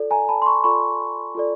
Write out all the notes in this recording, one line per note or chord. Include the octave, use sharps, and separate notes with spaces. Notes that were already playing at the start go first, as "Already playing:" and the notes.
Already playing: F4 A4 D5
G#5 A#5
A5 B5
C6
B5 C#6
F4 A4 D5 B5 C#6
F4 A4 D5